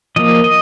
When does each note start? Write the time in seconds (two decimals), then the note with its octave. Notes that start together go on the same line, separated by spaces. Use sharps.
0.16 F3 A#3 D#5
0.44 D#5